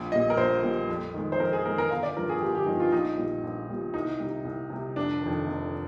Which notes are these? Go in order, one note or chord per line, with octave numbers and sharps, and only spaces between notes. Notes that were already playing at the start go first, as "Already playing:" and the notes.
Already playing: A#1
A#2 G3 D#5
A#4
A#1 C5
A#2 G3
F2
D#3 G#3
C5
F2 A#4
G#4
D#3 G#3 A#4
A#4
G1 F5
D5
G2 F3 A#4
G#4
G1 G4
G4
G2 F3 D#4
F4
A#1 D#4
A#2 G3
A#1
A#2 G3
C2 D#4
C3 G3
C2
C3 G3
F1 D4
F2 D#3
F1